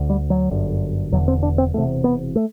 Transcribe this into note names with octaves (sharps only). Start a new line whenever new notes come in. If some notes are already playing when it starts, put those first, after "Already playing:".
Already playing: D2 D3
G3
F#3
G1 F#2 D3
E1 E2 D3 F#3
C4
D4
C4
E1 E2 C3 A3
B3
A3